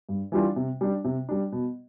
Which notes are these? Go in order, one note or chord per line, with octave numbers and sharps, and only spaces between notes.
G2
E3 G3 D4 F4
C3
G3 D4
C3
G3 D4
B2